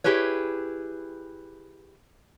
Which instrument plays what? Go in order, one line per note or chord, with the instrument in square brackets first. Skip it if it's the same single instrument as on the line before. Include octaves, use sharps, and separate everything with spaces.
[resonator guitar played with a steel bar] E4 G4 G#4 B4 C#5